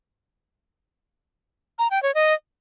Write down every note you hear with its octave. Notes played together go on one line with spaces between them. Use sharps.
A#5
G5
C#5
D#5